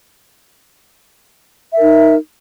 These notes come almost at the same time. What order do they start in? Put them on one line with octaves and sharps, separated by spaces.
E5 A#4 D#4